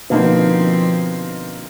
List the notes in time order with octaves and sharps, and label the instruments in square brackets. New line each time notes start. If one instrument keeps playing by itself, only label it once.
[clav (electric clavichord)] B2 [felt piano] D3 A#3 D#4 [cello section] F3 C4